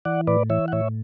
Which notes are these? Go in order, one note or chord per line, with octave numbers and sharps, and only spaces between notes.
E3 D5 F#5
A2 B4 D5
E3 C#5 E5
F#5
A2 C#5 E5